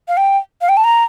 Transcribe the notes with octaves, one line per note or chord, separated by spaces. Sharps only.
F5
G5
F5
G5
A5
A#5